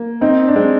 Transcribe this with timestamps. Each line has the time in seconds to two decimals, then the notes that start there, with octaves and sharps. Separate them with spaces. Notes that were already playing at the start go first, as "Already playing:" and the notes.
Already playing: A#3
0.21 C4 D#4
0.48 D4
0.56 G#3 C4